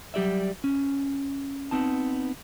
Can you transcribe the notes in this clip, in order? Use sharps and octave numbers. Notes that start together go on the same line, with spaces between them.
F#3 G3 G4 D5 E5
C#4
B3 C4 D#4 A5